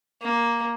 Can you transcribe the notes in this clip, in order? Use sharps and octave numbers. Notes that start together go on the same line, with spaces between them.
A#3